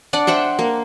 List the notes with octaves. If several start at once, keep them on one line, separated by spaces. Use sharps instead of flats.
D4 D5 F#5
C5 E5 F#5 G5
A#3